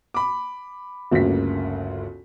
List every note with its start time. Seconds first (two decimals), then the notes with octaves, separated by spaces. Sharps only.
0.14 B5 D6
1.11 G1 D2 C#3 A#3 B6